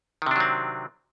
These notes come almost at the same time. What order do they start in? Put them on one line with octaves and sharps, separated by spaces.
D#3 C3 D4 F#3 C4